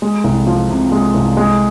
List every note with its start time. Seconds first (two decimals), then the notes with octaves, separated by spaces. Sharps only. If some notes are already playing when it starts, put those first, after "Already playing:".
0.02 G#3
0.24 C2
0.47 F3
0.69 C3
0.92 G#3
1.14 C2
1.37 G#3